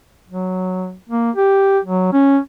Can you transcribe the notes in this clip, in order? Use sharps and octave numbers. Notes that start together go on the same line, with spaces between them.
F#3
A#3
G4
F#3
C#4